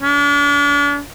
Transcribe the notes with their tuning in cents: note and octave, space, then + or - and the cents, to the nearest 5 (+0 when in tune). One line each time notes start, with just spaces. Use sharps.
D4 -40